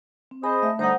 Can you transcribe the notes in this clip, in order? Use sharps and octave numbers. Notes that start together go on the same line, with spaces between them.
C4
G#4 C5 D#5 B5
A3 E5
D3 G3 D#4 C5 F#5